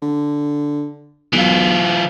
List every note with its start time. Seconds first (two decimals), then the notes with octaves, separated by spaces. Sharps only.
0.02 D3
1.33 B1 E3 F4